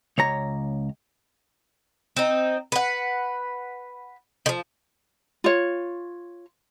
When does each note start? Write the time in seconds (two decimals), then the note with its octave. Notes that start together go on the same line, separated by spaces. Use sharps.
0.18 C#2 C#5 A#5
2.17 C4 D#4
2.72 B4 F#5
4.46 D#3 F3
5.44 F4 C#5